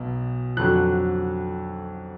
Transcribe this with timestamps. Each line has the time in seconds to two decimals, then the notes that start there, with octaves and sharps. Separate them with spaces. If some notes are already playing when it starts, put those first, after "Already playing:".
Already playing: B1 B2
0.57 F2 D3 F#3 F#6